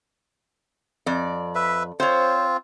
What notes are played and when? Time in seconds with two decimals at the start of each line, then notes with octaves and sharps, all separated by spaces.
1.06 F2 D5
1.55 B4 E5
2.00 C4 F4 C5 C#5